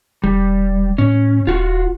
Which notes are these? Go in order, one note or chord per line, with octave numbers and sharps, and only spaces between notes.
E1 G3
A2 C#4
D#1 F4 F#4